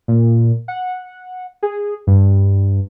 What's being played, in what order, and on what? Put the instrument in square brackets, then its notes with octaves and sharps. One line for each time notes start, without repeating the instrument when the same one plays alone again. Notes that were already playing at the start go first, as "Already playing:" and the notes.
[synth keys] A#2
F#5
G#4
G2